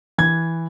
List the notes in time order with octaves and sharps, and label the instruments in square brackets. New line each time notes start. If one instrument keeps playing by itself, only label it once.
[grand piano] E3 G#6